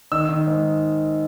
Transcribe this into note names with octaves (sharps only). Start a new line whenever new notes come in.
D#3 E6
D#3
G#2